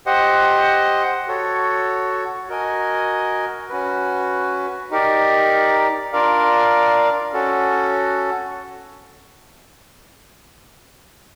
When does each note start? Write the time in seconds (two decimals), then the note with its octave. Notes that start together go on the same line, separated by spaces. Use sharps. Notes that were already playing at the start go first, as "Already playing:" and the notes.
0.06 G4 C5 D#5 F#5
1.28 F#4 A4 C#5
2.48 F#4 A#4 D#5 G#5
3.69 C#4 F#4 B4
4.91 D#4 G4 A#4 D5
6.13 D4 F4 A#4 D5 F5
7.34 C#4 F#4 A4